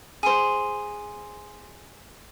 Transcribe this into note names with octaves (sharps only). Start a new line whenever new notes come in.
G#4 C5